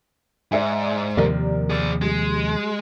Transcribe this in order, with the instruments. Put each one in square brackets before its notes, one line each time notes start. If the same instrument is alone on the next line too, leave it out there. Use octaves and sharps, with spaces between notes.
[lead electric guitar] G#2 [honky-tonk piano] D5 E5 G#5
[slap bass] D#2 C3 F3 [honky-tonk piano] G4 A#4 D5
[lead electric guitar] G#4 D5
[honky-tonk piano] G3 [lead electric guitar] G#3